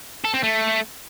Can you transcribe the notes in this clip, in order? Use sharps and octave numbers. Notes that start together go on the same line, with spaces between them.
A4
C4
A3